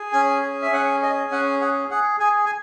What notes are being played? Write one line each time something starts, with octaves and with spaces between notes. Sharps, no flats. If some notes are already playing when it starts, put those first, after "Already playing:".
Already playing: G#4
C#4 G#5
G#4
E5
C#4 F#5
G#4 D#5
C#4 F#5
G#4 F#5
G#4 F#5
G#4 G#5
G#5